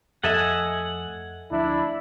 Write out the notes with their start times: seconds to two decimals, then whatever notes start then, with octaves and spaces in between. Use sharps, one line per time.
0.23 F2 F3 A3 A4 D#5 E5 F#5 G#5
1.51 D2 F3 D4 E4